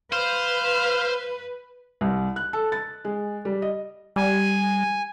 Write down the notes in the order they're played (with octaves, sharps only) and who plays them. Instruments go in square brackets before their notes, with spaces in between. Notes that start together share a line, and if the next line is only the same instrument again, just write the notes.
[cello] B4 [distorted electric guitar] C5 [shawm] F5
[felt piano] C2
F#6
A4
A6
G#3
G3
D#5
[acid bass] G3 [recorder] G#5